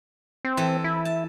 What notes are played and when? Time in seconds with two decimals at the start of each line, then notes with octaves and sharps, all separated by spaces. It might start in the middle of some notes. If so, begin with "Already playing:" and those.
0.45 C4
0.57 E3 A4 E5
0.84 E4
1.05 A5